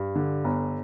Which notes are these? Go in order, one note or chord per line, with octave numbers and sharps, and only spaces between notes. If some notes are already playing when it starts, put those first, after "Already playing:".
Already playing: G2
D3
G1